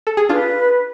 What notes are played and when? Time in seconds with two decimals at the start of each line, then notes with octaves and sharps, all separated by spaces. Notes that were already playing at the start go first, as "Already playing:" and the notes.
0.07 A4
0.17 G#4
0.29 D4 F4 B4